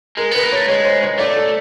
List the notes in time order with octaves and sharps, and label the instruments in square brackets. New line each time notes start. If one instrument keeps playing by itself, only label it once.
[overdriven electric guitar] G#3 [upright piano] A#4
[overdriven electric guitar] B3 [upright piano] B4
[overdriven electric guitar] A#3
[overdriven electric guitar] A3 [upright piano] C#5
[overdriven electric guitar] G#3 [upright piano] C#5
[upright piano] C5
C#5
[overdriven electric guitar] A3 [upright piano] D5
[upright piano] A4